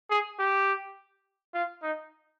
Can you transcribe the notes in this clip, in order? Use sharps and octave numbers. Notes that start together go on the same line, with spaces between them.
G#4
G4
F4
D#4